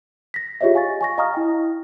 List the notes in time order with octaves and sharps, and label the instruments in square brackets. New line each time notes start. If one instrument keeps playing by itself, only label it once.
[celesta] A#6 B6
F4 G4 G#4 C#5 D#5 E5
F5 G#5 C#6 A6
G#5 C#6 A#6
D#5 F5 A#5 C#6 D#6 F6
E4 G5